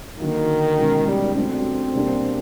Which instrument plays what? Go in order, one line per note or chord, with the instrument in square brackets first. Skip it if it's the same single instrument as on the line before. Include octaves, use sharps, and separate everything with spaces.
[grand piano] D3 F#3 A#3 [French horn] D#3
[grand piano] B2 G#3 C#4
[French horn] G3
[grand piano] F#3 A3 D4 F#4 [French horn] C4
[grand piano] B2 G3 A#3 D4